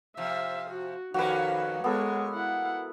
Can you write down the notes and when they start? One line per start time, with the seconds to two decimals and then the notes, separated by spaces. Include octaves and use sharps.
0.17 C3 F3 E5 F5
0.70 F#4
1.14 F2 D#3 A#3 C#4 F#4 B4
1.84 G#3 A#3 B3 A4 C#5
2.33 E4 F#5